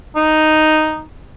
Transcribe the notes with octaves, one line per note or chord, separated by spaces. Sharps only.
D#4